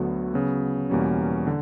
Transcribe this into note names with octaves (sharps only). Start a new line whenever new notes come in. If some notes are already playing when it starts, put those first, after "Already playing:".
Already playing: D2 D3 F#3 B3 F#4
C#3 F#3 B3
E2 B2 G3 A#3 C#4
D3